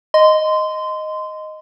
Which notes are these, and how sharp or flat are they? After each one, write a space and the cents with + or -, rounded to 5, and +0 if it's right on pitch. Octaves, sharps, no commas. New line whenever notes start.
D#5 +0 C6 -20